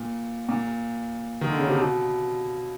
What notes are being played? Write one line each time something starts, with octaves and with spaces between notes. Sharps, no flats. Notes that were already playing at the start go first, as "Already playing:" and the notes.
Already playing: A#2
A#2
D#3
D3
C#3
C3
B2